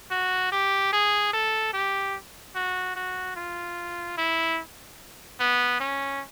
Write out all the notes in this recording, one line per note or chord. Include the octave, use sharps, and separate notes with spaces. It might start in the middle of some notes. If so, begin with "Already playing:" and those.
F#4
G4
G#4
A4
G4
F#4
F#4
F4
E4
B3
C#4